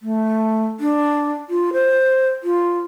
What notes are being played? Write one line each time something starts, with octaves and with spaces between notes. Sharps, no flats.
A3
D4
F4
C5
F4